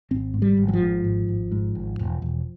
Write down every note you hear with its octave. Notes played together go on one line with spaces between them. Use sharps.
G#1 C4
G#2
G3
G#1
F#3
F3
G#2
G#1
G#1
G#2
G#1
E1
E1